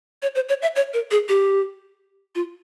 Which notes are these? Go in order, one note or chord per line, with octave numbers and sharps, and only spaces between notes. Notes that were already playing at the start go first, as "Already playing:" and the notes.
C#5
C5
C#5
E5
C#5
A#4
G#4
G4
F4